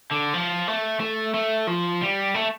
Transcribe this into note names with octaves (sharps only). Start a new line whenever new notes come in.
D3
F3
A3
A3
A3
F3
G3
A3